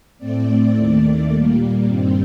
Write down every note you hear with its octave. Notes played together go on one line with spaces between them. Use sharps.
A2 A3 C4 D5
D#2 D#3 A3 D5
A#2 G3 A#3
G2 D#3 G3 C4